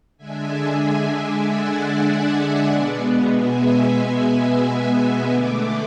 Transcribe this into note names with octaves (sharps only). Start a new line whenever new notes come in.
D3 G#3 D4 E5 G#5
D5 F#5
D5 F#5
B2 G#3 B3
E5 G#5
E5 G#5
E5 G#5
D3 A3 D4 D5 F#5